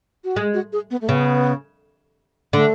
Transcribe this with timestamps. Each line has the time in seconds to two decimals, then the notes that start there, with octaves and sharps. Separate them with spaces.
0.24 F#4
0.36 G#3 G#4
0.54 F#4
0.73 G#4
0.91 B3
1.01 A3
1.08 C#3 B3
2.53 D3 A3